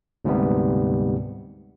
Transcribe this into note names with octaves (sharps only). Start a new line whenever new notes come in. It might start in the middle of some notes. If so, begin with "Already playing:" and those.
D2 G#2 C3 G3 B3